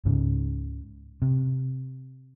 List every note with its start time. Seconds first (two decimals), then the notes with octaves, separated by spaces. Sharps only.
0.05 C#2 G#2 C#3
1.22 C3